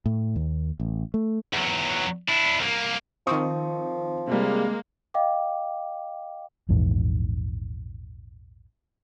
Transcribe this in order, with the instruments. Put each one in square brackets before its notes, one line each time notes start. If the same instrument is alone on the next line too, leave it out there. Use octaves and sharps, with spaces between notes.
[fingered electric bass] A2
D#2
A1
A3
[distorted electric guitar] E2 F#3
D4 E4
C2 A#3
[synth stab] D#3 C4 [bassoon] F3 [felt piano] C#6 D#6
[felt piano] C3 G3 [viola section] G#3 A#3
[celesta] D#5 F5 G5 D6
[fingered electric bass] A#1 E2 G#2